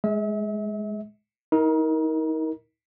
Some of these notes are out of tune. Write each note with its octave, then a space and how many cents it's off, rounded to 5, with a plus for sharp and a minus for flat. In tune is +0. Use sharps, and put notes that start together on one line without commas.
G#3 +5 E5 -40
D#4 +35 A#4 +10